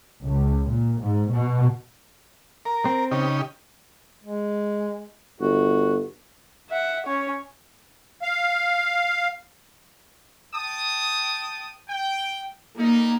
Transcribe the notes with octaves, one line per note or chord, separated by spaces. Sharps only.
C#2
A#2
G#2
B2
A#4
C4
C#3 D#4 G4
G#3
G1 F#4
E5 F#5
C#4 C#5
F5
G5 A5 D#6
G5
G3 A#3 D#4